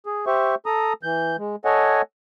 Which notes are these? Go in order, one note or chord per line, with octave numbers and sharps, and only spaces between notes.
G#4
G4 C5 E5 C#6
A4 A#5 D#6
E3 G6
G#3
A4 C#5 D#5 F#5 G#5